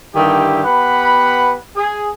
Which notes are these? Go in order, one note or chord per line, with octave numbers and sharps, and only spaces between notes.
G2 D3 D#3 E4 G4
B3 G4 B4 F#5 B5
G#4